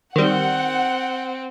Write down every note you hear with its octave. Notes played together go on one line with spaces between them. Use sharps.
D#3 G3 C4 F#5